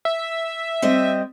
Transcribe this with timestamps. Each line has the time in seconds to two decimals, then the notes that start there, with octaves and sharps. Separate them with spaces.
0.05 E5
0.82 G3 C4 D#5